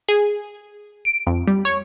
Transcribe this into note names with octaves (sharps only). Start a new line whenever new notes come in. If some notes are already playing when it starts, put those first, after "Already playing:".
G#4
D7
F2
G3
C#5